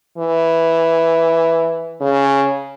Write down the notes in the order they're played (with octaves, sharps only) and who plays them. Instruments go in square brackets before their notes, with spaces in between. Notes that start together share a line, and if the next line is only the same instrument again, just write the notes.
[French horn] E3
C#3